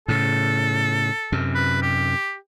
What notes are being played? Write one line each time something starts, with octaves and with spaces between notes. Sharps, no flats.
A2 C#3 A4
F#2 C3
B4
G4